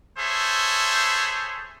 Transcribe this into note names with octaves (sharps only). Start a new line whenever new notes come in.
G#4 A4 C5 C#5 E5